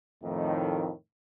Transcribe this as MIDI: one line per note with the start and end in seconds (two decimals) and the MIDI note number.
0.23 0.91 41
0.23 0.91 45
0.23 0.91 51